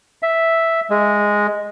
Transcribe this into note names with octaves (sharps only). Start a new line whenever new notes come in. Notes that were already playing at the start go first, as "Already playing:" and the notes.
E5
G#3